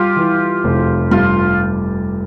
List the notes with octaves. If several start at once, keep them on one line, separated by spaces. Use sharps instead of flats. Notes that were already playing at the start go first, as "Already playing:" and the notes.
Already playing: G3 F4 G4
E3
F1
G2 F4